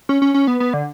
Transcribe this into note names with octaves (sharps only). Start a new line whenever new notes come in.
C#4
C#4
C#4
B3
B3
D3